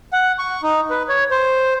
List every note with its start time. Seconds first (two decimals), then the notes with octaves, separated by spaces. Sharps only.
0.13 F#5
0.39 C#6
0.63 D#4
0.90 B4
1.09 C#5
1.31 C5